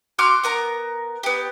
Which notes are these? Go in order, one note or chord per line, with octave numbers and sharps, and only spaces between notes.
F#4 C6 D6 F6
B3 A#4 A#5
B3 G4